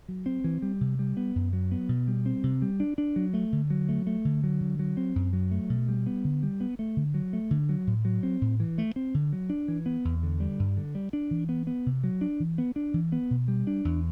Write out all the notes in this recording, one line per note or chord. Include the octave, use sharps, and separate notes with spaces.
F#3
C4
E3
G3
C3
G3
B3
F#2
F#3
B3
B2
G3
C4
C3
G3
D4
D4
F#3
A3
D3
F#3
A3
A3
D3
F#3
D3
F#3
C4
F#2
F#3
A3
B2
G3
B3
D3
G3
B3
A3
D3
F#3
A3
D3
F#3
A2
F#3
C4
A2
E3
A3
C4
D3
F#3
D4
E3
B3
E2
D3
G3
G2
D3
G3
D4
E3
B3
B3
C3
F#3
D4
E3
B3
D4
E3
B3
B2
G3
D4
E2